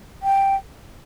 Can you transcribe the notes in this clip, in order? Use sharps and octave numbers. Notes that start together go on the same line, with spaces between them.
G5